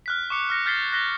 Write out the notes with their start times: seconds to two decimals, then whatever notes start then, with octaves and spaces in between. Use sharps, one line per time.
0.06 F6 F#6 B6
0.30 C#6 D6 C#7
0.50 F6 A#6 C#7
0.66 F6 G6 A6 B6 C7 G7
0.93 F#6 A#6 B6 G7